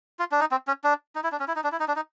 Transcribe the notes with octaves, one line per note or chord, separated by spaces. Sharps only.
F4
D4
D#4
C4
C#4
D4
D#4
E4
D4
C#4
E4
D#4
D4
E4
D#4
D4
D#4